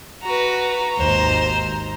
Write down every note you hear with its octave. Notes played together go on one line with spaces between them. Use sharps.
F#4 B4 A#5
G#1 D#2 C5